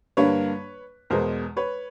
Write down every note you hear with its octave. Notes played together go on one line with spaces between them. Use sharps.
G2 D3 G3 A#3 B4 C#5
E2 B2 G#3 A#4 C5
B4 C#5